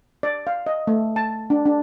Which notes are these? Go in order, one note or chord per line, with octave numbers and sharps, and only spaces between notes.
D5
F5
D#5
A3
A5
D4
D4